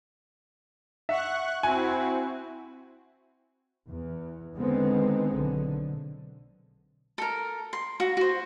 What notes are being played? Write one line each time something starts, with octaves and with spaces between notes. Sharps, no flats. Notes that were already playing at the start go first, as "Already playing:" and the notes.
E5 F#5 C#6 F#6
C4 E4 F#4 G#5
E2
D3 D#3 G#3 B3 C4
B1 D3
A4 A#4
C6
F#4
F#4 C5